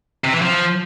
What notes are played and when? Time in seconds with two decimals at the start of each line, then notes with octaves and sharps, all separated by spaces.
0.24 C3
0.33 E3
0.42 F3